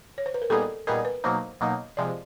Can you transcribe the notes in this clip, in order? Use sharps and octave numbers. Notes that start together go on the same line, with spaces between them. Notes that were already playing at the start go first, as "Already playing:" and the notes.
C#5
C5
B4
A#4
A#2 G3 B3 D#4 G#4 A4
A#2 G3 B3 D#4 G#4 A#4
B4
B2 F#3 A#3 D#4 C5
B2 F#3 A#3 D#4
C3 F3 G#3 D5